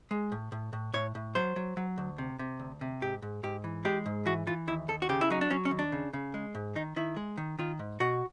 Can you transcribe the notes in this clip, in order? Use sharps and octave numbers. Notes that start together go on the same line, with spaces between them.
G#3
A2
A2
A2
A2 C#5
A2
F#3 C5
F#3
F#3
D2
C3
C3
D2
C3
G#2 G4
G#2
G#2 G4
E3
G#3 G4
G#2
E3 F#4
E3 F4
D#2 E4
D#2 A4
F#4
C#3 G4
E4
F#3 D#4
D4
F#3 C#4
C#4
D#2
D4
C#3
C#3
G#3
G#2
D#3 D#4
D#3 E4
G#3
D#3
D#3 F4
G#2
B2 F#4